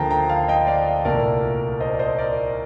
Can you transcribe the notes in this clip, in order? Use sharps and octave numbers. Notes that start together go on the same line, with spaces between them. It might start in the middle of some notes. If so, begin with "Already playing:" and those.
Already playing: D2 D3 F3 A#3 G5 A5 A#5
G5 A#5
F5 A5
D#5 G5
D5 F5
C2 A#2 A3 A#4 D5
C5 D#5
D5
C5 D#5
A#4 D5